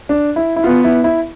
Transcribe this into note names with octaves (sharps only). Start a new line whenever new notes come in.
D4
E4
E4
B3 F4
E4
E4